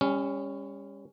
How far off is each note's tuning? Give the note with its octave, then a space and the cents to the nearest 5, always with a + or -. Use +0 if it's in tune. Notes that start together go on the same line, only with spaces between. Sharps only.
G3 +40 C#4 +0